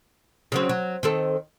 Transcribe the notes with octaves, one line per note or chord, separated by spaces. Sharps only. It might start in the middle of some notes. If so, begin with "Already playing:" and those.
C#3 F#3 C4
F#3
D#3 C4 A4